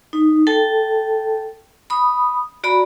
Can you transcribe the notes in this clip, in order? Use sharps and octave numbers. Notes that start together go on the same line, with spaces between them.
D#4
A4 G5 A5
B5 D#6
F#4 D5 A#5 B5